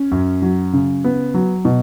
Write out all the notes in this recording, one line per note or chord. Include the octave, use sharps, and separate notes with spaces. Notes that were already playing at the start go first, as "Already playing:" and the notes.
Already playing: C#4
F#2
F#3
C#3
B3
F#3
B2